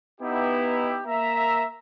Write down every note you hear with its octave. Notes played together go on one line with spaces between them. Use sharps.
B3 D#4 E4 G4
A#3 E5 A#5